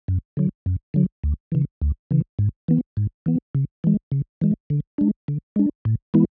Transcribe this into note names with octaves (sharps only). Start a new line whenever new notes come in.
F#2
D3 F#3
F#2
D3 F#3
D2
C#3 E3
D2
C#3 E3
G#2
E3 B3
G#2
E3 B3
C#3
E3 G#3
C#3
E3 G#3
D3
G#3 D4
D3
G#3 D4
A2
E3 G#3 B3 E4